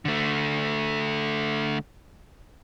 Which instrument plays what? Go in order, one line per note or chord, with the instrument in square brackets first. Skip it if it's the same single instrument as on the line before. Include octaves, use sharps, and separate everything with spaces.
[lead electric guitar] D3 A3